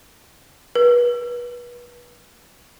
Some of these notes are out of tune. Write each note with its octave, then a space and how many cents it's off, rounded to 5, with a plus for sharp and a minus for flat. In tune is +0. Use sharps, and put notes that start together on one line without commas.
B4 -30